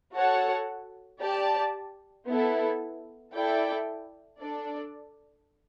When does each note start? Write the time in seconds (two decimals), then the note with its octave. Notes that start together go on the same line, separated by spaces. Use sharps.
0.14 F#4 A4 C#5 F#5 A5
1.21 G4 D5 A5
2.27 B3 E4 A4
3.33 E4 A4 D5 G5
4.39 D4 A4 D5